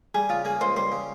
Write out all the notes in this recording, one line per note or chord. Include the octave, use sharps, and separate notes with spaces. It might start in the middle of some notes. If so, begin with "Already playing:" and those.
G3 G#4
C#3 F4
A#3 G#4
C#2 C5
G3 C5
C#3